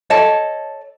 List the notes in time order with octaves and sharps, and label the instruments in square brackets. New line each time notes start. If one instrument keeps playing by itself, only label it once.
[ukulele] A4 C#5 D#5 A5